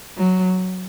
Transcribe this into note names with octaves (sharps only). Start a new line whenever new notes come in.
F#3